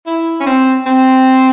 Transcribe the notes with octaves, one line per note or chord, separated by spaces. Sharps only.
E4
C#4
C4
C4